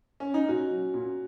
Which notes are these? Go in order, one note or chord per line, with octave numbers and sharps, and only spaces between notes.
C#4
D#4
A#2 C#4 F#4
F#3
A#2